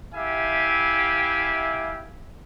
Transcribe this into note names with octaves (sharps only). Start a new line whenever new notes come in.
E4 G4 E5 F5 G#5